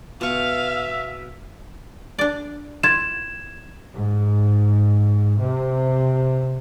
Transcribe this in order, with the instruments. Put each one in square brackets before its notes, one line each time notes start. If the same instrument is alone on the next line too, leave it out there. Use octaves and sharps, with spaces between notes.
[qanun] B2 C#6 [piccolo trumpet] E5 [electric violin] F5
[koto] D4 D5
[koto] E4 F4 [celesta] G#6 E7
[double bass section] G#2
C3